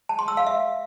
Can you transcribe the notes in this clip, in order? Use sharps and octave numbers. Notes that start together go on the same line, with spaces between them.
A5
C6
E6
F5
E5